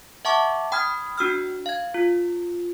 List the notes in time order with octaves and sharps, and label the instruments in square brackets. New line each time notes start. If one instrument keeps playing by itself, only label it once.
[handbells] E5 F#5 A5 C#6 D6
G5 B5 D#6 F6 G#6
D4 F#4 E6 F6
F5 G#6
F4